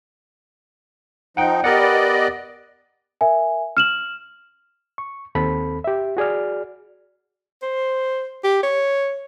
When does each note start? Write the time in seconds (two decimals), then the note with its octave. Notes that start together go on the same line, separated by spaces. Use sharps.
1.37 F3 D#4 F#5 G5
1.64 B3 G4 A#4 D5 D#5 F#5
3.21 A#4 E5 G#5
3.77 F6 E7 F#7
4.98 C#6
5.35 D#2 C4 A4 B5
5.84 G4 E5
6.17 F#4 G#4 D5 F6
7.63 C5
8.44 G4
8.63 C#5